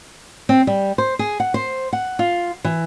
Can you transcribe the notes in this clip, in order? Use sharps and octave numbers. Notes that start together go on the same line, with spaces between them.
C4
G3
C5
G#4
F#5
C5
F#5
F4
E3